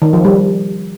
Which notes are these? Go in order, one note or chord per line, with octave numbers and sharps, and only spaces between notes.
D#3
F3
G3